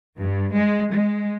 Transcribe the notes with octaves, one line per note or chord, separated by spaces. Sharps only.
G2
G#3
G#3